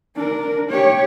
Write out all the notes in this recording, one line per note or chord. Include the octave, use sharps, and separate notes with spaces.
D4 A#4
G4 C#5